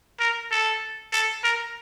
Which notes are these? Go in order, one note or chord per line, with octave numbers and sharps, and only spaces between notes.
A#4
A4
A4
A#4